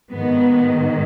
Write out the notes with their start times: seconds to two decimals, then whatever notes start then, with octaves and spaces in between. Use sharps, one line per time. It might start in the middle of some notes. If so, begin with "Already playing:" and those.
0.11 G#2 D#3 B3